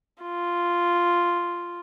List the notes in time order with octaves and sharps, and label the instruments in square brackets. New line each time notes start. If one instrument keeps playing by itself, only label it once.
[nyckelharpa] F4